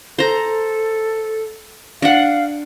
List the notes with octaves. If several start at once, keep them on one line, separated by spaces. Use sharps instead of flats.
A4 C5 A#5
D4 F5 F#5